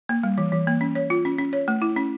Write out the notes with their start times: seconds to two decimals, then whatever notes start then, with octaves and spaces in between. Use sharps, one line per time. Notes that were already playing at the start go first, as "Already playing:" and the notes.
0.09 A#3
0.23 G3
0.38 E3
0.52 E3
0.67 A#3
0.81 C#4
0.95 C#5
1.10 F4
1.25 C#4
1.38 C#4
1.53 C#5
1.68 A3
1.82 E4
1.96 C#4